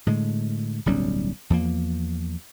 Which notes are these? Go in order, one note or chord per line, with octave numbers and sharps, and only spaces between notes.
A2 D3 G#3
D1 B1 G3 C#4
E2 F3 A#3